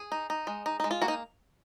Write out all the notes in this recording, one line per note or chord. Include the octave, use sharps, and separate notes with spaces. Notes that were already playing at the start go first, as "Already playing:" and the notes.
Already playing: G#4
D#4
D#4
G#3
D#4
G#3 D#4
F4
A#3 F#4
D#4